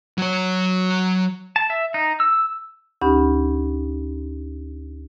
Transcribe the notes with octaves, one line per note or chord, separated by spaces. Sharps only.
F#3 C#5
A5
E5
D#4
E6
D2 C#4 D#4 G4 B5